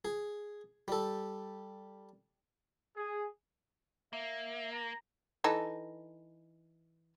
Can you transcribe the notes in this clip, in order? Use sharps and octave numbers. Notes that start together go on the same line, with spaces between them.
G#4
G3 A4
G#4
A#3 E5
A#5
E3 D#4 A4